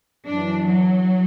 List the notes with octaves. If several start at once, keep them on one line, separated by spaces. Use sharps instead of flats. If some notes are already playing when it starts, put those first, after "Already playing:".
F#2 E3 D4
F#3